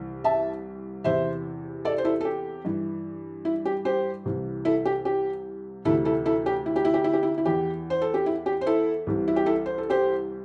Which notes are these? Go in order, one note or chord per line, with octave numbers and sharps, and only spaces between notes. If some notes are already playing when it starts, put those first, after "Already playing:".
Already playing: C2 C3 E3
E5 A5
E2 C3 E3 C5 E5
A4 D5
C5
E4 A4
A4
G4
G2 E3
E4
G4
G4 C5
C2 C3 E3
E4 A4
G4
G4
D2 C3 E3 E4 A4
E4 A4
E4 A4
G4
E4
G4
E4
G4
E4
G4
E4
E4
E2 E3 G4
C5
A4
G4
E4
G4
C5
E4 A4
C2 C3 E3
E4
G4
E4 A4
C5
A4
G4 C5